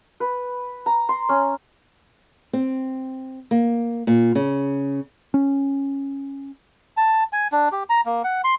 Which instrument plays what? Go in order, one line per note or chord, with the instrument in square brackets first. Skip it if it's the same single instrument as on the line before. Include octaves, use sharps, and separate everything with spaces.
[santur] B4
A#5
C6
C#4
[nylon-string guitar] C4
A#3
A#2
C#3
[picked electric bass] C#4
[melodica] A5
G#5
D4
G4
A#5
A#3
F#5
C6